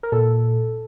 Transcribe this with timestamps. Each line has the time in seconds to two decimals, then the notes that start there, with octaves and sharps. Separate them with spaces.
0.03 A#4
0.12 A#2 A4